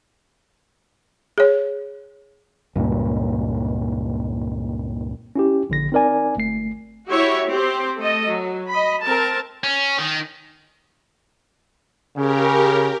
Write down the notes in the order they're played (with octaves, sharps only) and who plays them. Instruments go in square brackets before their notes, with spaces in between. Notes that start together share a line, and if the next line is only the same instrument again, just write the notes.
[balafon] G#4 C#5
[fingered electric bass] C#2 G2 A#2
[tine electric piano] C#4 E4 G4
A#1 D3 A#6
C4 D#4 A#4 D5 G#5
G1 A3 C7
[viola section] E4 F#4 G4 C#5 E5
C4 G4 C5
A3 A4 D#5
F#3
D#5 B5
C4 A#4 A5
[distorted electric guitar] C#4
D#3
[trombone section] C#3 [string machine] G4 A#4